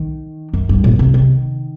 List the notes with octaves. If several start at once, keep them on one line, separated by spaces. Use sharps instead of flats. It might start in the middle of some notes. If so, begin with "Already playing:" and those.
Already playing: D#3
F#2
G2
A#2
C3
D#3